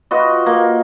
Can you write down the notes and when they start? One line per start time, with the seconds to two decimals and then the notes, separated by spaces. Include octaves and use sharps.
0.11 F4 F#4 B4 D#5
0.46 A#3